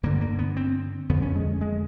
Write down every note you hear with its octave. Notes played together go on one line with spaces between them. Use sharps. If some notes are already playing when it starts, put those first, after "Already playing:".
G2 D3 A#3
A#3
B3
C4
F2 D3 B3
C#4
G#3
G#3